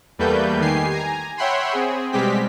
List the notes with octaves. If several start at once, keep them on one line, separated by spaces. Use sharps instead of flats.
E2 G3 A3 A#3 B4 G6
D#3 G4 G#5 C7
G#5 A#5
C#5 E5 F#5 G5 B5 C6
C4 G#4
B2 G3 G#3 C4 G4 B6